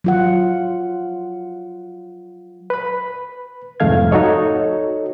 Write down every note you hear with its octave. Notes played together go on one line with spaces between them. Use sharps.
F#3 F4 F#5
B4 B5
C2 F2 G#2 A3 F5 G#6
D#4 F#4 A4 C#5 D#5